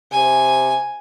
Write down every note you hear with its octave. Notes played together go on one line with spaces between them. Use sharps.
C3 G#5